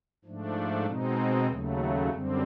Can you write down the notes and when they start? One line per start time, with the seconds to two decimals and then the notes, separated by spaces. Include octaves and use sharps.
0.25 G#2 F3 A3 D4
0.85 B2 G#3 C4 D#4
1.47 D#2 C#3 F#3 A3
2.09 F#2 D3 G3 C4